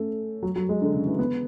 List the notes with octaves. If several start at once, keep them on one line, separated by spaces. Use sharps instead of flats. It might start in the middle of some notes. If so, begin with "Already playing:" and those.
Already playing: A3 C#4
F#3
F#3
G#3
D3
C#3
E3
B3